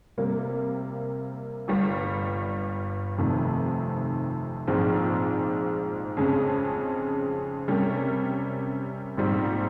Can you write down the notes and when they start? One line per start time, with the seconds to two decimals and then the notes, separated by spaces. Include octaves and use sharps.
0.18 C3 G3 A#3
1.68 G1 G2 G3
3.18 F1 F2 C3 D#3
4.68 A#1 G#2 F3 G#3 C4
6.17 F2 C#3 G#3 C#4
7.68 C3 G3 C#4 G4 A#4
9.17 A#1 G#2 G3 C4